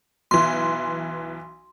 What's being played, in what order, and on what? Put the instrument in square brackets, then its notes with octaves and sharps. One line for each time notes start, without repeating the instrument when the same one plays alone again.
[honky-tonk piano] B1 E3 [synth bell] C6